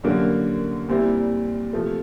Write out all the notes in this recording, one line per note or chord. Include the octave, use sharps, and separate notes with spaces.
F#2 D3 G3 A#3
A#2 G3 C4 E4
C3 F3 A3